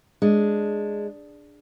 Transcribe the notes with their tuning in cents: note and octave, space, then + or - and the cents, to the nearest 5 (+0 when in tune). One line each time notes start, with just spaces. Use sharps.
G#3 +0 D4 +0